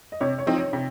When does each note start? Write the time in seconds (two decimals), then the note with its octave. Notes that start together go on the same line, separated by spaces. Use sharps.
0.12 D#5
0.21 C3 C#5
0.38 C#5
0.47 F3 C4 D#4
0.56 C#5
0.73 C3